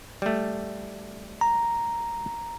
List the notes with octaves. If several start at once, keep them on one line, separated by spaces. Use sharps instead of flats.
G3 A3
A#5